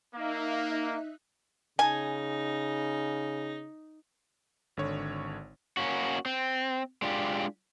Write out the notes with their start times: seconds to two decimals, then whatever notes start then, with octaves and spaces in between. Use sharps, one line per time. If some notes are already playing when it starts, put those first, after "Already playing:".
0.14 A#3 D#4 E5 F#6
1.79 C#3 D#4 G#5
4.77 G#1 D3 C#5
5.77 A#3 C#4 F#4
6.26 C4
7.02 G#3 D4 F4 G4